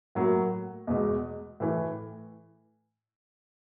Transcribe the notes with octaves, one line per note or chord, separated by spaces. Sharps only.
A2 F#3 A#3
E2 B2 G#3
A2 E3 A3